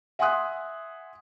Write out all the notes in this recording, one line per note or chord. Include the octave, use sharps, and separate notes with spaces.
E5 F#5 G#5 C6 D#6 F#6